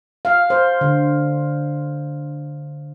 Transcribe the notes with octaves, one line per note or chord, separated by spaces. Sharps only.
F5
C5
D3